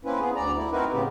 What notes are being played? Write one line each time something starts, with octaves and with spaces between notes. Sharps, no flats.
A#3 C4 C#4 E4 B4
B3 G#4
D2 D5 A#5
A3 E4
C4 D#4 E4 F#4 A#4 B4
A2 C#3 B3 G4